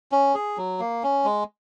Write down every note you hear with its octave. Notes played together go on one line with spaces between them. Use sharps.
C#4
G#4
F#3
A#3
C#4
G#3